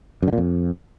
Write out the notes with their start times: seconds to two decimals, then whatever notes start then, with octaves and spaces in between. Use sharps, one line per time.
0.22 F#2
0.28 D3
0.33 A#2
0.38 F2